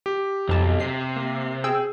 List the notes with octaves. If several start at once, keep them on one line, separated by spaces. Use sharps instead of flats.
G4
B1 F2 A5
C3 C7
A#3
G#4 G5 E6